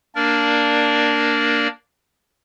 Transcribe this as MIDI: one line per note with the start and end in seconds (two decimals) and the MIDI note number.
0.15 1.68 58
0.15 1.68 62
0.15 1.68 70
0.15 1.68 74